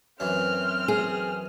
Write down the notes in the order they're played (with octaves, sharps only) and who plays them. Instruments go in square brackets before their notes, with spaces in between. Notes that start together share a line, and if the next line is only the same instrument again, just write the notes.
[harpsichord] F#2 E3 [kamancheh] C4 F6
[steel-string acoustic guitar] G#4